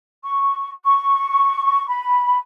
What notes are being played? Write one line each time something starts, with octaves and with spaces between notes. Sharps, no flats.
C#6
C#6
B5